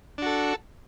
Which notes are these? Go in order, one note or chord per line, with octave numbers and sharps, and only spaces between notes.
D4 F#4 A4